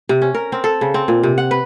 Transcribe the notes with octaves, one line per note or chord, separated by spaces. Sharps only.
C3
C#4
A#4
C4
A4
C#3
C4
A#2
C3
F#5
B4